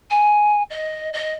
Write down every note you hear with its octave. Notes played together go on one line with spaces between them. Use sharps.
G#5
D#5
D#5